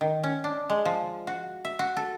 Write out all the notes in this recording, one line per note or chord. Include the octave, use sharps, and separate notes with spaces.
D#3
C#4
D4
G#3
F3
F#4
E5
F#4
A4